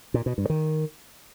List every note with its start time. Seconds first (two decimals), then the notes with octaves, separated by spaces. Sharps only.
0.14 A#2
0.26 B2
0.38 G2
0.50 D#3